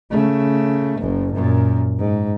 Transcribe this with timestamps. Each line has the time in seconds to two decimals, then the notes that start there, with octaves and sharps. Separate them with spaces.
0.11 C#3 A3
0.99 F#1 F#2
1.33 F#2 A#2
1.99 G#2